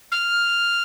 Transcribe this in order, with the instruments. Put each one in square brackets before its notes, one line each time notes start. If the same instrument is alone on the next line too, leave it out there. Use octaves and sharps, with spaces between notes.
[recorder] F6